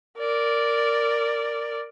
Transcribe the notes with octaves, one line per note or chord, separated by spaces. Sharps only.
A#4 D5